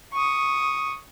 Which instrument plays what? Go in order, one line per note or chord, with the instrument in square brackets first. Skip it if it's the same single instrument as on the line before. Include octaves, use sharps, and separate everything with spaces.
[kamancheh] C#6 D#6